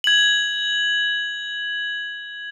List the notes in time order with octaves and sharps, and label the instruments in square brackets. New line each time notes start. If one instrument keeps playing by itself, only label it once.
[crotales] G#6 F#7